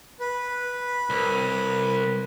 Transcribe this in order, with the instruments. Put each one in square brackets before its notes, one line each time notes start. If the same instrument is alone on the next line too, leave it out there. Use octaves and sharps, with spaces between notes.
[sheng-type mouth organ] B4
[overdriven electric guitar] C2